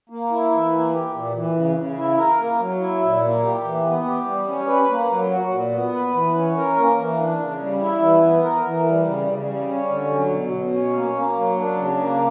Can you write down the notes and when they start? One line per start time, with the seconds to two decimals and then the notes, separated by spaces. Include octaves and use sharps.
0.09 A#3
0.30 E4
0.51 E3
0.72 A#3
0.92 G4
1.13 A#2
1.34 E3
1.55 C#3
1.76 C#3
1.96 E4
2.17 A#4
2.38 A#3
2.59 F#3
2.79 E4
3.01 A#2
3.22 A#3
3.43 G4
3.63 E3
3.84 B3
4.06 G4
4.25 G3
4.47 C#4
4.67 B4
4.88 A#3
5.09 F#3
5.30 F#4
5.51 A#2
5.71 B3
5.93 B4
6.13 E3
6.34 C#4
6.55 A#4
6.76 A#3
6.98 E3
7.18 D4
7.39 C#3
7.59 G3
7.80 E4
8.01 E3
8.22 B3
8.43 A#4
8.64 E3
8.85 G3
9.05 C#3
9.27 C#3
9.47 G3
9.68 C#4
9.89 D3
10.10 F#3
10.30 B2
10.52 B2
10.72 C#4
10.93 A#3
11.14 A#3
11.35 F#3
11.56 D4
11.77 C#3
11.98 A#3